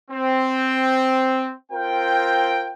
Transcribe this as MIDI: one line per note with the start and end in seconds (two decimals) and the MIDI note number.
0.11 1.52 60
1.72 2.73 60
1.72 2.73 65
1.72 2.73 70
1.72 2.73 79